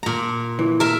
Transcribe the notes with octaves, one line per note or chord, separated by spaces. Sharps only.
A#2 A#5
E3
A#4 E5